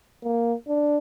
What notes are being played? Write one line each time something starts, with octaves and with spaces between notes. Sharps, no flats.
A#3
D4